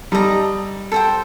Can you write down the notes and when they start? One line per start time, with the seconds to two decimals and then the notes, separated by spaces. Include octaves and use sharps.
0.12 G3 D#4 A4 D#5 A#5
0.92 A4 C5 G5